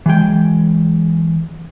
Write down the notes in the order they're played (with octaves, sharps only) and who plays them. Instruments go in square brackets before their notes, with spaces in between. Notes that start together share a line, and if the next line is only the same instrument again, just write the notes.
[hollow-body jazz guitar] E3 F#3 G#3 G5